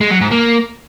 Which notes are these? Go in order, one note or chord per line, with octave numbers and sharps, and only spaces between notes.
G#3
F#3
G#2
A#3